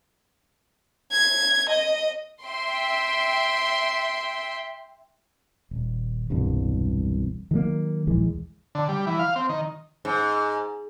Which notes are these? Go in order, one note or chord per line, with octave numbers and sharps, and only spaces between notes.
G#6
D#5
E5 G5 C6
D#1
E1 C2 G2
D#3 F#3 G#3 A#3
A#1 D#2 E3 G#3
D3
G3
E3
F5
C4
D#3
G#2